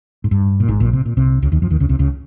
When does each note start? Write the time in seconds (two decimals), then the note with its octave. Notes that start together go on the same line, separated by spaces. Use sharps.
0.24 G#2
0.31 G2
0.60 A#2
0.68 G#1 G#2
0.80 A#1 A#2
0.93 C3
1.05 A#2
1.17 C2 C3
1.42 C#2 C#3
1.52 D#2 D#3
1.62 F2 F3
1.70 D#2 D#3
1.80 C#2 C#3
1.89 C2 C3
1.99 C#2 C#3